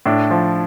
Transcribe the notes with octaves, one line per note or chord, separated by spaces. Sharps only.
A2 D4
F3